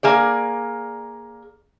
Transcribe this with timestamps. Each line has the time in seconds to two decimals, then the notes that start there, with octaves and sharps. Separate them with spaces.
0.03 A#3 G#4 D5